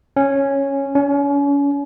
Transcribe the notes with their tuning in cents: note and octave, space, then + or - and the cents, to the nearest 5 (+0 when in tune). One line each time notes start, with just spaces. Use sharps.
C#4 -5
C#4 +35